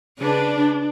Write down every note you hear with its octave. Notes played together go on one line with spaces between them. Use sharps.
C#3 D4 G#4 B4